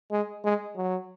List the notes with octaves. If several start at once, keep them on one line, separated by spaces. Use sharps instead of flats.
G#3
G#3
F#3